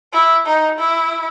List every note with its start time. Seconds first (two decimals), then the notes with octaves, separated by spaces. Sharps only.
0.13 E4
0.46 D#4
0.78 E4